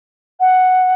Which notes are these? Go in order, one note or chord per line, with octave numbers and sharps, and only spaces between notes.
F#5